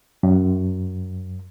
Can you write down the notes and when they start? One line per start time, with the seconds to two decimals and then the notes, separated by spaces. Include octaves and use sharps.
0.23 F#2